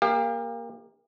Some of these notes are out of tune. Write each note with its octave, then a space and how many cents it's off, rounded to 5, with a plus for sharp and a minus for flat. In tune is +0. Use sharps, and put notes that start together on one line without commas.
A#3 +5 G4 +35 F5 +0